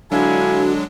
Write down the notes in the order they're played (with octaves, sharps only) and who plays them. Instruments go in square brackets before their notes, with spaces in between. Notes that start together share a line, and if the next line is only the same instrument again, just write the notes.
[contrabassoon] D3 [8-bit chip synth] F#3 G#3 D4 [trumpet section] E4 F5 G#5 [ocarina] F#4